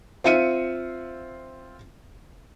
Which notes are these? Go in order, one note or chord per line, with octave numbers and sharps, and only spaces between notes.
C4 F4 E5 C#7 D#7